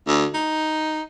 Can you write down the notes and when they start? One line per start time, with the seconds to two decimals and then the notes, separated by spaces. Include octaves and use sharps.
0.07 D2
0.34 D#4